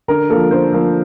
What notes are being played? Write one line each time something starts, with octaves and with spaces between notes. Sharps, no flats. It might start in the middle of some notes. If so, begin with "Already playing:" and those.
D3 A#4
F3 A#3 A4
D3 C5
F3 A#3